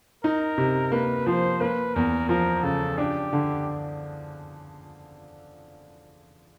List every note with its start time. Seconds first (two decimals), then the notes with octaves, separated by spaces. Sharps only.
0.24 D#4 A#4
0.58 C3
0.92 A#3 B4
1.26 F3 C5
1.61 A#3 B4
1.95 E2 A#4
2.29 F3 A#4
2.63 C#3 A4
2.98 D4 G4
3.33 D3